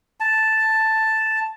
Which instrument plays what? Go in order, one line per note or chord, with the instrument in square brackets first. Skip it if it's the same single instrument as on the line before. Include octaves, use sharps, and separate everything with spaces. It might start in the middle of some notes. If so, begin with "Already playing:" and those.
[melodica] A5